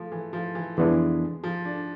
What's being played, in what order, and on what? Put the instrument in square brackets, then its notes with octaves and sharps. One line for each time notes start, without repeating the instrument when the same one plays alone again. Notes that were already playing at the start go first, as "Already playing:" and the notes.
Already playing: [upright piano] F3 A3
E3
F3
E3
[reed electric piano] F2 E3 B3 D4 [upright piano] G#3
[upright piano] F3
D4